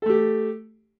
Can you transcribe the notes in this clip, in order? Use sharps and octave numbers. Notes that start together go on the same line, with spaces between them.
A3 G4 A4